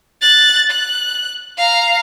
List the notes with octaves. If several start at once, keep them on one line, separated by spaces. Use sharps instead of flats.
F#6 A6
F#6
F5 A#5